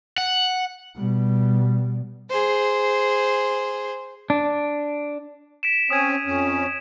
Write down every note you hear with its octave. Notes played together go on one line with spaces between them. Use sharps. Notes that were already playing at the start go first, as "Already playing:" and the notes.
F#5
B2 G3
G#4 C5
D4
B6 D7 E7
C4 C#4 D#6 G#6 D#7
F2 C#4